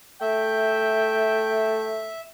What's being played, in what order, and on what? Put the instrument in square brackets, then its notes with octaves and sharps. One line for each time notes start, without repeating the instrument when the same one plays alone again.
[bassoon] A3 [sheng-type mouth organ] E5 [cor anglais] G5